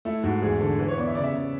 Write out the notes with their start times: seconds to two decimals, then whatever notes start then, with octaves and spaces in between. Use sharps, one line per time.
0.05 A3 E4
0.23 G#2 F#4
0.42 E2 G#4
0.60 D3 A4
0.79 E3 B4
0.88 C#5
0.98 B3 D5
1.07 E5
1.15 C#3 D5
1.24 E5
1.35 C#3